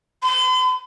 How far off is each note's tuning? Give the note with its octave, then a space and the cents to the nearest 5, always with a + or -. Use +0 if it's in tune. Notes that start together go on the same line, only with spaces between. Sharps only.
C6 -45